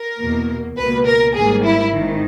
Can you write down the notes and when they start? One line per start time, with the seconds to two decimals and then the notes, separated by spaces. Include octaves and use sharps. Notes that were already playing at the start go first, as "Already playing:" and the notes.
Already playing: A#4
0.19 E2 B2 A#3
0.77 C#2 B2 A#3 B4
1.06 A#4
1.34 G#1 G#2 G3 A#3 G#4
1.63 E4
1.91 G#1 G#2 D#3